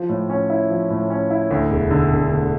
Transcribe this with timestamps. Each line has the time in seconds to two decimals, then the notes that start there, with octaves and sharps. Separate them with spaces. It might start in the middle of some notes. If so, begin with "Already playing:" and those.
Already playing: F3
0.09 A2
0.30 C#4
0.50 E4
0.70 F3
0.90 A2
1.10 C#4
1.30 E4
1.51 D2
1.71 E1
1.91 D3
2.12 E1
2.31 D2